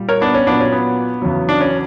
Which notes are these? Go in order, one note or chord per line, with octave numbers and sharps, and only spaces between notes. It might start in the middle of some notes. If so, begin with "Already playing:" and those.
Already playing: A#2 G3
A#4 C#5
B3 D4
C#4
A#2 F#3 B3 D4
C#4
B3
E2 C#3 F#3
D4
C#4